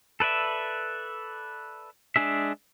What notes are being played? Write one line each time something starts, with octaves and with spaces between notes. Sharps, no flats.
A4 B4 D5 E5
G#3 D4 G#4 E5